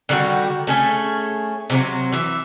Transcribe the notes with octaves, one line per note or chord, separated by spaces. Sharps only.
D3 D#3 G3 F#4
A3 C#4 G#4
C3 F3 F#3
E3 E5